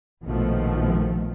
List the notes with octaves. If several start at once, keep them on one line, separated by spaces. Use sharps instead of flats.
A#1 B2 D#3 F3 A3